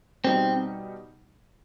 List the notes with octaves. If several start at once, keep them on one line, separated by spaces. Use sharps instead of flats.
B2 G3 C4 D#4